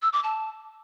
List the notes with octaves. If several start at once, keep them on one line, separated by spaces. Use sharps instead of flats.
E6
D6
A5